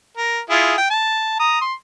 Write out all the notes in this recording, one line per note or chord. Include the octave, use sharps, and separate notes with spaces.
A#4
E4 F4 G#4
G5
A5
A#5 D#6
C6